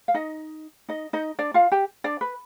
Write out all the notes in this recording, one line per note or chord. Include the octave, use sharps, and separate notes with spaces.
F5
D#4 D#5
D#4 D#5
D#4 D#5
D4 D5
F4 F5
G4 G5
D4 D5
B4